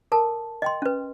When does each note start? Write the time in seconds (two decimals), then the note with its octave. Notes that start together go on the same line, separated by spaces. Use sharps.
0.12 A4 A#4 A5
0.62 D#5 G5 C6
0.82 C#4 B4